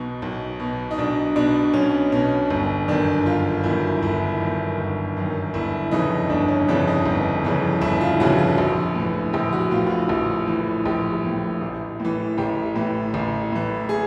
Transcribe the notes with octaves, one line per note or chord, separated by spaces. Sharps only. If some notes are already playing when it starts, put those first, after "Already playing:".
Already playing: B1 B2 D#4
B1
B2
D#4
B1 D4
B2 D4
B1 C#4
B2 C#4
G1
F#2 D#3 D4
G1 F4
F#2 D#3 E4
G1 E4
F#2 D#3
G1
F#2 D#3
G1 E4
F2 C#3 E3 D#4
G1 D4
C#4
F2 C#3 E3 D4
D#4
G1
F2 C#3 E3
G1 E4
F4
F2 C#3 E3 F#4
F#4
A#1
A2 E3
A#1 G4
F#4
A2 E3 F4
F4
F#4
A#1
A2 E3
A#1 G4
A2 E3
A1
A2 E3
A1 G4
A2 E3
A1
A2 E3
G#4